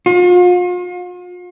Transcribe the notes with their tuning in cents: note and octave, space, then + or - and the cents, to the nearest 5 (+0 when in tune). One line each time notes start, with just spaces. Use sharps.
F4 +40